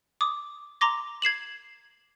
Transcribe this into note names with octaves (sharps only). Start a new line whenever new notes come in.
D6 D#6
A#5 C6 D6 A#6
G#6 C7 E7 F#7